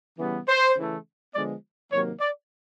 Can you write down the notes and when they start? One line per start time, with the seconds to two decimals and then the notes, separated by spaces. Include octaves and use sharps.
0.18 C#3 E3 G3 B3
0.47 C5
0.76 C#3 E3 A3
1.33 D3 F3 G#3 B3 D5
1.91 C3 D#3 F#3 A#3 C#5
2.20 D5